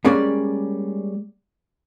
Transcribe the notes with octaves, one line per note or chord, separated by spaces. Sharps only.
G3 G#3 A#3 C#4 D5